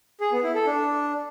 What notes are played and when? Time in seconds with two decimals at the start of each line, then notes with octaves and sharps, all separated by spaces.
0.21 G#4
0.32 B3
0.44 E4
0.55 A4
0.66 D4